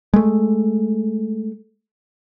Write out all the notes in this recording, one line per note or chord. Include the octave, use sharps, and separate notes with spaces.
G#3 A3